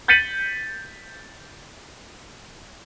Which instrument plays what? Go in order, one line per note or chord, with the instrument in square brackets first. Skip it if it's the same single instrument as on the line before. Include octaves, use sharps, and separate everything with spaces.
[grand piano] G6 A6 B6 C#7 D#7 F#7